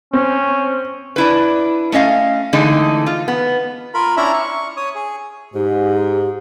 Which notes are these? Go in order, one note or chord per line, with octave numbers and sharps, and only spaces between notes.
C4 C#4
D4 E4 B4
A3 C#4 D#5 F5
D3 E3 G#3 A3 D#4
F4
B3
F4 A#4 B5
C#4 D4 E4 E5 A#5 B5
C#6
C#5 D#6
G#4
G#2 G4